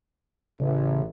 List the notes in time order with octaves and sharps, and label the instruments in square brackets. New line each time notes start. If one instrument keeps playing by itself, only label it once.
[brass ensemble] A1 [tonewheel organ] C#3